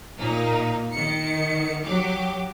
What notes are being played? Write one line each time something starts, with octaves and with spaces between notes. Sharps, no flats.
A#2 A#3 D#4
D#3 C#7
F#3 G4 D6